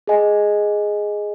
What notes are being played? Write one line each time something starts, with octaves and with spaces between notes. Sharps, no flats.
G#4 D#5 G#5